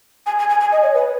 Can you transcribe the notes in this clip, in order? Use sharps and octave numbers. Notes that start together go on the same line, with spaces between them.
G#5
G#5
G#5
G#5
D#5
C#5
B4